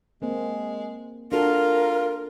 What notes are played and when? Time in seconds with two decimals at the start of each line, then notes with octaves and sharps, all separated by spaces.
0.22 G#3 A#3 C4
1.32 D4 F4 F#4 A4 A#4